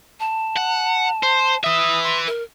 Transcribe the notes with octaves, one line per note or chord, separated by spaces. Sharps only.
A5
F#5
C5
B4 E5 D#6
C6
A#4